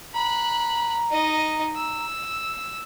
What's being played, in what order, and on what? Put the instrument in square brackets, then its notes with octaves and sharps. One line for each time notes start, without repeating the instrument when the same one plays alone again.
[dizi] A#5 [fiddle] B5 F#6
[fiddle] D#4 D#5
E6